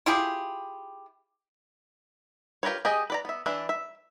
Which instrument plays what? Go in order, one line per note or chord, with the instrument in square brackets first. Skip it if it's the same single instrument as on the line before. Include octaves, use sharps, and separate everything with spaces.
[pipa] E4 F4 G4 G#4
[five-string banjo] F4 G4 A#4 B4 C#5
G4 G#4 D#5 G#5
B4 D5 A#5
B3 E5
E3 D4 E4 B4
E5